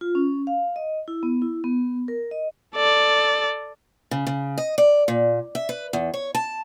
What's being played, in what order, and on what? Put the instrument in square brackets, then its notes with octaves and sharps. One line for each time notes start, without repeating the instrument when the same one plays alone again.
[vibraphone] F4
C#4
F5
D#5
E4
B3
E4
B3
A#4
D#5
[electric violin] A4 D5
[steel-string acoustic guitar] C#3
C#3
D#5
D5
A#2
E5
B4
E2
C#5
A5